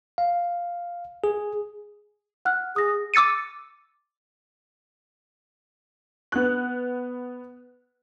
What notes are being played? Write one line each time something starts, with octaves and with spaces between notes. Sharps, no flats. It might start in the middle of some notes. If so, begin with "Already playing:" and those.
F5
G#4
F#5 F6 F#6
G#4 D#6 A#6
D6 E6 A6 C#7 D#7
B3 F#6